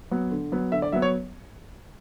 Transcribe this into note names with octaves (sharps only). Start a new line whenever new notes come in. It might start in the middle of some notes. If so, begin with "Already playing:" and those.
F#3 B3
D3
F#3 B3
D3 E5
D5
F#3 B3 E5
C#5